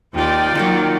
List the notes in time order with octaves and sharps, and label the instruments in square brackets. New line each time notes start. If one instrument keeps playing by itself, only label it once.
[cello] D#2 [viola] D#4 D5 [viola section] F4 G5
[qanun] D#3 A#3 A#4 [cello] F#3